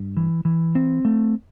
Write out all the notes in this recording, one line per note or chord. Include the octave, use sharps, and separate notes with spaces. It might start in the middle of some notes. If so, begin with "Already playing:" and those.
Already playing: G2
E3
E3
C4
A3